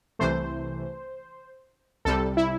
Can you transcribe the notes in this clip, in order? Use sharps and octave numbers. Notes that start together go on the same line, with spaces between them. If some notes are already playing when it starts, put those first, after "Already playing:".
C2 C3 E3 A3 C5
C2 C3 G3 A4
E4